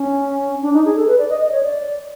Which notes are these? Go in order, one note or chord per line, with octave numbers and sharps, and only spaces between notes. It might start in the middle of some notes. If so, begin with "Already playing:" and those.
Already playing: C#4
D4
D#4
G#4
A4
B4
D5
D#5
D#5
C#5
D5